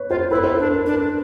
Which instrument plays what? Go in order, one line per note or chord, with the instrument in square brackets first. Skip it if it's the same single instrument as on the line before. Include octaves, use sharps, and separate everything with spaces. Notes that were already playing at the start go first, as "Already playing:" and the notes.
Already playing: [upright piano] B4 C#5
[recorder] F4 [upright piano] C5
[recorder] E4 [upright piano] B4
[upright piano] C5
[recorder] D4 [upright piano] B4
[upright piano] A#4
[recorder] D4
[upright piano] A#4